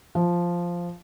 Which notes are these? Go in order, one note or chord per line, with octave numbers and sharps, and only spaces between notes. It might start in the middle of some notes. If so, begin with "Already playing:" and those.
F3